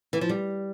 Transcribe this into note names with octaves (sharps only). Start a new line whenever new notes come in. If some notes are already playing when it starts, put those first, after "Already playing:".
E3
F3
G3